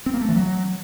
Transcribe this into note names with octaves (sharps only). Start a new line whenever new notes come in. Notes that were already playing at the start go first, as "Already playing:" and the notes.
C4
A#3
A3
E3
F#3